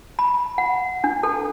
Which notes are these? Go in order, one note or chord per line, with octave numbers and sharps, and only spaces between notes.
B5
F#5
D4
A4